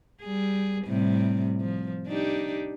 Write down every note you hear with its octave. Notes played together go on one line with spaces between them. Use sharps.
G3 G#4
A2 C3 G3
F3
D4 D#4 G4